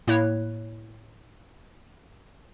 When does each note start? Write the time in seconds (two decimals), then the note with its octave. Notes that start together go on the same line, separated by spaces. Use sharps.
0.07 A2 A#3 E4 C#5 F#6